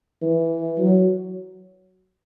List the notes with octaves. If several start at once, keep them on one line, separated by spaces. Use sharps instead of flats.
E3
F#3